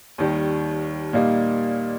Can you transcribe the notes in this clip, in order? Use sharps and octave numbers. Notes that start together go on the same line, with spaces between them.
D#2 D#3 G3
A#2 G3 A#3 D#4